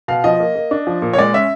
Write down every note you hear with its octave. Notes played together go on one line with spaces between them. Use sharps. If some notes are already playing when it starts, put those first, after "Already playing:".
B2 F5
F3 D#5
A#3
A#3
D4
F3
A#2
C#5
G#3 D5
C#4 E5